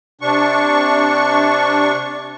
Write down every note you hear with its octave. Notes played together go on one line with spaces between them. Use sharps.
C3 D4 C#6